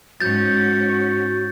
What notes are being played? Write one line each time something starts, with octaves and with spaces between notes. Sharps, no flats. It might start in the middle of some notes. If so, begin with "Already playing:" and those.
G#2 C#4 F#4 G6 A6